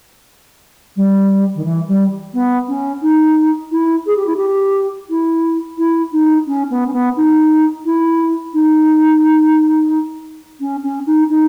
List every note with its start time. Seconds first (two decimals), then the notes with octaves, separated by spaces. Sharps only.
0.96 G3
1.55 D#3
1.64 E3
1.88 G3
2.33 B3
2.68 C#4
3.01 D#4
3.71 E4
4.06 G#4
4.16 G4
4.26 E4
4.36 G4
5.09 E4
5.77 E4
6.12 D#4
6.47 C#4
6.70 B3
6.86 C#4
6.93 B3
7.16 D#4
7.85 E4
8.53 D#4
10.60 C#4
10.83 C#4
11.06 D#4
11.29 D#4